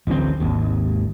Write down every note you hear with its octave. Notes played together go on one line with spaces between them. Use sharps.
D1 A1 D2 C4
G#1 D#2